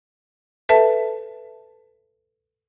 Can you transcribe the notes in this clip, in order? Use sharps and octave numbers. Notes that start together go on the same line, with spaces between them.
A4 B4 E5 A5